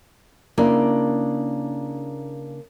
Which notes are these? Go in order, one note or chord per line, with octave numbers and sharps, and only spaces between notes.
C#3 A#3 D4 E4 D5